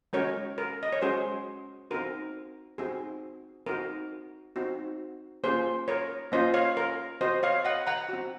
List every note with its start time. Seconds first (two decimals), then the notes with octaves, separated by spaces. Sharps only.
0.13 G#3 C#4 F#4 A#4 C#5
0.58 A#4
0.83 D#5
0.93 C#5
1.02 G#3 C#4 F#4 G#4 C5
1.91 C4 D#4 F#4 A#4
2.78 C4 D#4 F#4 G#4
3.66 C4 D#4 F#4 A#4
4.56 C4 D#4 F#4
5.44 A#3 C#4 F4 G#4 C5
5.88 A#4 C#5
6.32 A#3 C#4 F4 C5 D#5
6.54 C#5 F5
6.77 A#4
7.21 C4 F#4 C5 D#5
7.43 C#5 F5
7.65 D#5 F#5
7.87 F#5 A#5
8.09 C4 F#4